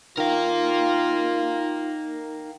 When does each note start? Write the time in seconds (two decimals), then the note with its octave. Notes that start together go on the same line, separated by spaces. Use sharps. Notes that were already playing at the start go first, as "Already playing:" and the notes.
0.18 D#3 D#4 F4 A#4 F5